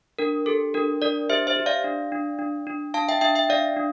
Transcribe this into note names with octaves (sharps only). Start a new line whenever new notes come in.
D4 A#4
G4 A4
D4 A#4
D4 A#4 D5
G4 C5 E5
C5 E5
G4
D5 F5
D4
D4
D4
D4
D4 F5 A5
E5 G5
D4 E5 G5
E5 G5
D4 D5 F5
D4